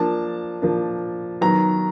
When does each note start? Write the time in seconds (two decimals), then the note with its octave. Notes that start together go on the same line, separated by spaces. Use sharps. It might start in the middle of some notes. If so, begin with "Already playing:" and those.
Already playing: F3 A#3 D4 A5
0.62 F3 A#3 D4
1.41 D#3 F#3 B3 A#5